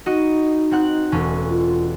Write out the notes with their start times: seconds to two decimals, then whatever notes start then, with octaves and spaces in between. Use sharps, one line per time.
0.06 D#4 F#4 D#5
0.71 C4 F#5 F#6
1.12 E1 A3 C#4
1.47 F4